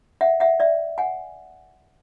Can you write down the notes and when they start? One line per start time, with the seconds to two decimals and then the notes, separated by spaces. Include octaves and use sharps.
0.21 E5 F#5
0.40 E5 F#5
0.60 D5 E5
0.98 F#5 G#5